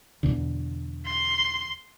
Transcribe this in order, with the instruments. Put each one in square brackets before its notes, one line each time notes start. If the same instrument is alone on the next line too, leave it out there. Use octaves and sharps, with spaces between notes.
[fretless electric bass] E2 B2 D3
[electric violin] C6